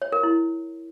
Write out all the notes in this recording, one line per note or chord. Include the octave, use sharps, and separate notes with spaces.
C#5
A#4
E4